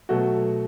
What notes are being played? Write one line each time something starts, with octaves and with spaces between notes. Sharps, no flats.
B2 F#3 A3 F#4